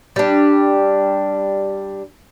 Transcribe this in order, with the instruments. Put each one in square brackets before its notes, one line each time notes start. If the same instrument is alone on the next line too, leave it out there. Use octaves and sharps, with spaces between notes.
[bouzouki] G3 D4